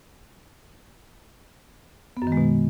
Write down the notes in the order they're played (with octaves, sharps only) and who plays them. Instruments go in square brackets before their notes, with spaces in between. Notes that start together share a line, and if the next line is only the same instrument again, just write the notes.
[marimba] B3
F#2
D#3
G#3
B2